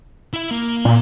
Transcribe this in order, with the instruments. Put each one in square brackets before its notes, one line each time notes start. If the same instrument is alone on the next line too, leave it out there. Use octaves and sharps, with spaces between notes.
[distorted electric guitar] E4 E5
A#3
[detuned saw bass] A#2